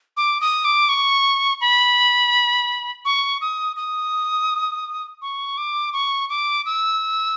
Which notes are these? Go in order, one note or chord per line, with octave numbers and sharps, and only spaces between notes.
D6
D#6
D6
C#6
B5
C#6
D#6
D#6
C#6
D6
C#6
D6
E6